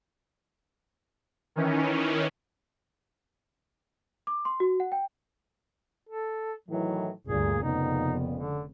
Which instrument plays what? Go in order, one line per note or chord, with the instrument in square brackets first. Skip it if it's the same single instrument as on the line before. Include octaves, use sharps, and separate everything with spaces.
[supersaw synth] D#3 E3 C#4
[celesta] D6
C6
F#4
F#5
G5
[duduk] A4
[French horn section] A2 D#3 E3 [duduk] F#3
[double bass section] G1 D2 [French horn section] A#2 [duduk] G#4
[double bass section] F1 C#3 [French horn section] F2 A#2 B3 [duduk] D#4
[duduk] D3